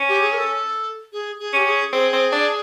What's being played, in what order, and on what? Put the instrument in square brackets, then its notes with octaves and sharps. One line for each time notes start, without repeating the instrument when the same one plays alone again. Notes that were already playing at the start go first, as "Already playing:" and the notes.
Already playing: [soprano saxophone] C#4
[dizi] G4
G#4
A#4
A4
G#4
G#4
[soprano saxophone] C#4 [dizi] G4
[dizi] G#4
[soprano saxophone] C4 [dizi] G#4
[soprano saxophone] C4
D4